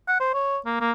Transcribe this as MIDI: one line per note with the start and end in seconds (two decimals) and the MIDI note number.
0.08 0.16 78
0.20 0.34 72
0.34 0.58 73
0.66 0.76 58
0.81 0.92 58